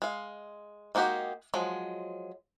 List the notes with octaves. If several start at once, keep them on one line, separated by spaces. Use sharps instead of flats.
G#3 F5
G#3 A#3 D#4 F#4 G4
F3 F#3 G#3